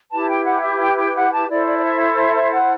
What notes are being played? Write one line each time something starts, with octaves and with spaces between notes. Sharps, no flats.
E4 G4 B4 A5
G5
F#5
E5
G5
G5
F#5
A5
E4 A4 C5 D5
D5
D5
E5
E5
E5
E5
F#5